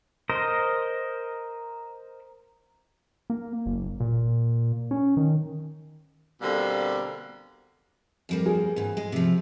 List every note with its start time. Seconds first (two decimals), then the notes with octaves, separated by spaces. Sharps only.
0.30 A#4 C5 D#5
3.30 A#3
3.66 F#1
4.00 A#2
4.91 C#4
5.17 D#3
6.41 B2 D3 G3 A#3 C4
8.29 F2 G3 A#3
8.46 G#4
8.76 G#2 E3
8.97 G#3
9.12 C3 F3